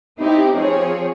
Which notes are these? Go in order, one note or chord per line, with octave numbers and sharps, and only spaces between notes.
C4 D#4 E4 G4
F3 C4 G#4 C#5